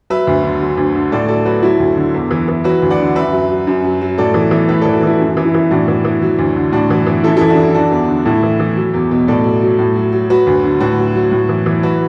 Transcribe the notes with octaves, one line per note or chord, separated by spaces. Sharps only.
F#3 B4 E5
D2
D3
F#3
D2
D3
A2 A4 D5
F#3 A4 D5
F#3 F#4 B4
F#3 E4 A4
D2
D3
E2
E3
E3
F#3 F#4 B4
D2
D5 F#5
D3
F#2 B4 E5
F#3
F#3
F#2
F#3
F#3
A2 A4 D5
E3
E3
A2 B4 E5
E3 A4 D5
F#4 B4
E3 E4 A4
F#2
E3
E4
E3
A2 D4 F#4
E3
E3
F#3
D2
D3
A2 D4 F#4
E3
E3
F#2 E4 A4
E4 A4
E3
D4 F#4
E3 E4
F#3 D4 F#4
E2
D3
A2 E4 A4
E3
E3
F#3
E2
B2
A2 A4 D5
F#3
F#3
A2
F#3
F#3
F#3 F#4 B4
D2
D3
A2 F#4 B4
F#3
F#3
A2
E3
E3
F#3 F#4 B4